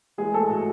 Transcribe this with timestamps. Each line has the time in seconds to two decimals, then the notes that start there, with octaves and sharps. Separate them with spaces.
0.18 E3 G#3 G#4
0.33 A3 A4
0.49 A2 F#4